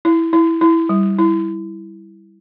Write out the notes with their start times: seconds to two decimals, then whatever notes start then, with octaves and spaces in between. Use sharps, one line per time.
0.05 E4
0.33 E4
0.61 E4
0.89 G3
1.18 E4